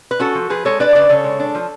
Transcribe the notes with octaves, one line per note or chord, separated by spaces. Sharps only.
B4
C#4 F#4 A4
F3
F3 G#4 B4
G#3 A4 C#5
D4 B4 D5
C#3 B4 D5
C#3 A4 C#5
G#3
D4
F3